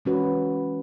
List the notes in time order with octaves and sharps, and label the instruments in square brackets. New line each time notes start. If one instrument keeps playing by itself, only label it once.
[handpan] E3 G#3 C#4 F#4 B4